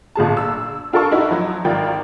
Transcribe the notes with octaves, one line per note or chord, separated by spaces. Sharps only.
G1 A#2 G#4 A5
E6
D4 F4 A4 A#4 A5 C#6
D#4 E4 F#4
F3 F#3
G#1 F4 A#4 D5 G5